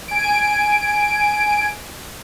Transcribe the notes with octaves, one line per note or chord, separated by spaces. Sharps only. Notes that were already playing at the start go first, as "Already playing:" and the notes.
G#5 D7